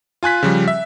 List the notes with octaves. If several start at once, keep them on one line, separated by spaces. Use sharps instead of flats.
F4 G#5 F#6 B6
C#3 F3 G3
E5